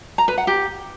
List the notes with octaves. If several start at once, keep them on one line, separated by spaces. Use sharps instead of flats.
A#5
B4
F#5
G4